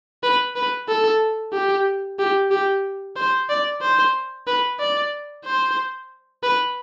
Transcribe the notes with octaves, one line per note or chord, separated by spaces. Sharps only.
B4
B4
A4
G4
G4
G4
C5
D5
C5
B4
D5
C5
B4